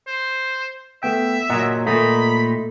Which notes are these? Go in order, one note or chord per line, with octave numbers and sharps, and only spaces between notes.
C5
A3 B3 E5 G5
A#2 F#3 D#5 F#5 A#5
A#2 A3 D#4 B5